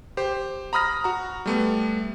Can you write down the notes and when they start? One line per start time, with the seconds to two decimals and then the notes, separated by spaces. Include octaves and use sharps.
0.17 G4 C5
0.73 A#5 B5 D#6 F6 A#6
1.04 F#4 A#5
1.46 G3 A3 B3